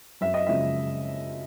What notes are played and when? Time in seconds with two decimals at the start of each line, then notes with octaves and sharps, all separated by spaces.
0.21 F#2 E5
0.34 D#5
0.47 C#3 F3 G#3 E5